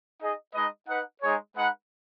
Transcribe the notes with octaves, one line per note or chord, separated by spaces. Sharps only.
D#4 G#4 D#5
G#3 D#4 B4 D#5
D#4 B4 F#5
G#3 D#4 G#4 C#5
G#3 D#4 B4 F#5